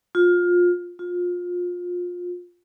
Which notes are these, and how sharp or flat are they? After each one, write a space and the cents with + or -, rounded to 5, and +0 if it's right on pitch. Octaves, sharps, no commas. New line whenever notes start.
F4 +20
F4 +25